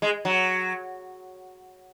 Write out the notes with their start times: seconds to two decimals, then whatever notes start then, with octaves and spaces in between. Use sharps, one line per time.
0.02 G#3
0.25 F#3